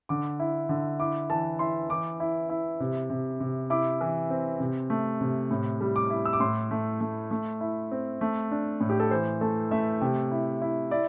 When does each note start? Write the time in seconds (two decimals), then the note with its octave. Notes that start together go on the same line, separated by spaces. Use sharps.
0.09 D3 D6
0.40 E4
0.69 D3
0.99 E4 D6
1.30 E3 A5
1.59 E4 C6
1.90 E3 D6
2.20 E4
2.50 E4
2.80 C3
3.10 C3
3.40 C3
3.70 E4 D6
4.01 E3
4.30 C4
4.60 C3
4.90 A3
5.21 C3
5.51 A2
5.81 G3
5.96 D6
6.10 E4
6.26 E6
6.33 D6
6.40 A2 C6
6.71 A3
7.01 A3
7.31 A3
7.61 E4
7.91 C4
8.21 A3
8.51 D4
8.81 A2
8.90 G4
9.00 A4
9.11 E3 C5
9.41 A3 A4
9.71 A3 E5
10.01 C3 G5
10.31 E4
10.62 E4
10.91 E4 D5